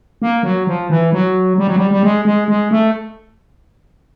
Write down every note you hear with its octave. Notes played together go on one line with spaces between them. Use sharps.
A#3
F#3
F3
E3
F#3
G3
F#3
G3
G3
G#3
G#3
G#3
A3